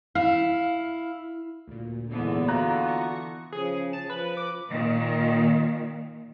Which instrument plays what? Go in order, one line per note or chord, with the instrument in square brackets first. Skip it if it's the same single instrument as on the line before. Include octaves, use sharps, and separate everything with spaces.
[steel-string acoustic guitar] E4 [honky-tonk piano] F5
[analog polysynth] D2 A#2
[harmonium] E2 G#2 [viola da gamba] D3 E3 B3
[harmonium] F4 F#4 [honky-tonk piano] A#5 F#6
[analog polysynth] C#6 A#6 C#7
[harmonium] C#3 F3 [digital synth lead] G#4
[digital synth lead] A5
[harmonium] F3 [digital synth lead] B4
[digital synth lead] D6
[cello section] A#2 D#3